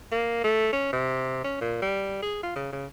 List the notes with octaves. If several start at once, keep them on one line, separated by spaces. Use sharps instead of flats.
A#3
A3
C#4
C3
C#4
A#2
G3
G#4
F4
C#3
C#3